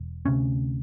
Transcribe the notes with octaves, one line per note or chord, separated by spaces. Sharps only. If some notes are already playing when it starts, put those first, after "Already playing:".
Already playing: E1
D2 C3 C#4